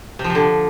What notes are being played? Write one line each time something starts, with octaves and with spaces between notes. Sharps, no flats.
C3
F3
C3
D3